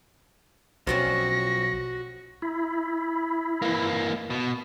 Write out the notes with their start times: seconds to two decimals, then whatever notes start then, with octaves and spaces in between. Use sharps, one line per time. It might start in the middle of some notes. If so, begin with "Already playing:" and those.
0.87 B1 F3 C4 C#4 F#4 A#6
2.42 E4
3.62 E3 A#3
4.30 B2